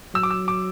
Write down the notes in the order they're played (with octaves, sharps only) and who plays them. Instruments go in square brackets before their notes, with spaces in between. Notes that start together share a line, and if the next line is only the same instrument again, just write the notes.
[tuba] F#3 [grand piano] E6
[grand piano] D6
E6
D6